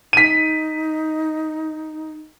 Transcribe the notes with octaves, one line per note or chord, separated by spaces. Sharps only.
D#4 B6 D#7